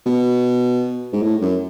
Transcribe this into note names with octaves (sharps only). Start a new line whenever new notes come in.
B2
G#2
A2
F#2